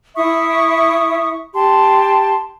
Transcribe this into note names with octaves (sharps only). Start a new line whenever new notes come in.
E4 E5 C#6 D#6
G4 A5 C6